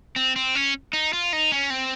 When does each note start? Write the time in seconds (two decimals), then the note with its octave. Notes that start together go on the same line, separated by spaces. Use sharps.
0.16 C4
0.36 C4
0.55 C#4
0.93 D#4
1.13 F4
1.33 D#4
1.52 C#4
1.70 C4